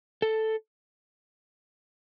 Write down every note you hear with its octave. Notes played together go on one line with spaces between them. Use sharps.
A4